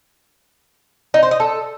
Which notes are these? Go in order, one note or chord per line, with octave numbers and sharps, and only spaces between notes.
D#4
C5
D#5
A4